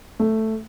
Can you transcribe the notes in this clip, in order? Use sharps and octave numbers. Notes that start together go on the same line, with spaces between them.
A3